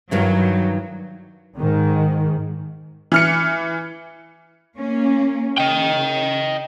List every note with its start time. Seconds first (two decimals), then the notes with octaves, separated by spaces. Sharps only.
0.11 G2 D#3 E3 F#3
1.58 G#2 D#3
3.12 E3 F6 C#7
4.78 A#3 C#4
5.58 C#3 D#5 G5